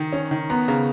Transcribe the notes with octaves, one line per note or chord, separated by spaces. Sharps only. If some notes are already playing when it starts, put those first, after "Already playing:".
Already playing: D#3 A#5
C#4
D#3
B3 A#5
C#3 A#5